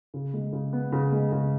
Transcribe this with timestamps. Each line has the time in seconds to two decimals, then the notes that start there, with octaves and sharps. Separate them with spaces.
0.14 C#3
0.34 G#3
0.53 C#3
0.73 B3
0.92 C#3
1.12 G#3
1.32 C#3